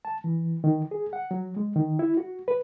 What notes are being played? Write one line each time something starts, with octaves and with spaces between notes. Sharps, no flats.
A5
E3
D#3
G#4
F#5
F#3
G#3
D#3
E4
F#4
B4